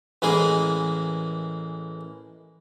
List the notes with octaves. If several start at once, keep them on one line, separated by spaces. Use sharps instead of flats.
A1 E3 G#3 A#3 G#4